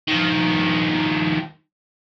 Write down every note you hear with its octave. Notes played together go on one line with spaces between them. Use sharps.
D#3 F3